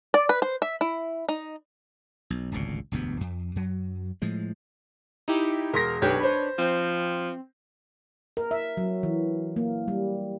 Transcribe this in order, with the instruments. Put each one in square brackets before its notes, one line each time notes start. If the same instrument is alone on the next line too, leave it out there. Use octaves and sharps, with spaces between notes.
[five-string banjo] D5
B4
C5
E5
E4
D#4
[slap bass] B1
D1 G#1 C#2 A#2
E1 D2 G2 B3
F2
F#2 F#3
A2 F3 G#3
[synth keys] D#4 E4 G4
[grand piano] E1 C6 A#6 [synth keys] A#4
[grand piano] B1 G4 G6 [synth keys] D4 B4 C#5
[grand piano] C5 B5
[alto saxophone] F3 [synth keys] C4
[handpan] A#4
E5
F#3
E3
A#3
G3